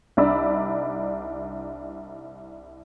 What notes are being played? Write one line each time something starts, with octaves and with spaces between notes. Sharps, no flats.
C2 D4 D#4 D5 B5 E6